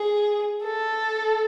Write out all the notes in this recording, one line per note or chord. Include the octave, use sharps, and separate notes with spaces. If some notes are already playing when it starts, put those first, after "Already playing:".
Already playing: G#4
A4